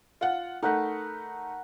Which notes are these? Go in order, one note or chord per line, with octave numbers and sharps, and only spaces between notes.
F4 F#5
A3 D#4 A#4 F#5 B5